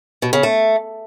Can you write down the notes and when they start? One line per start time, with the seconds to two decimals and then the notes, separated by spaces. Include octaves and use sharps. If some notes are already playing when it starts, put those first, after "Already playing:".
0.22 B2
0.33 C#3
0.43 A3